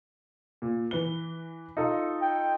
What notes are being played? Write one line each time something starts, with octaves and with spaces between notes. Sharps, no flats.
A#2
E3 B4 G7
D#4 F4 A4
G5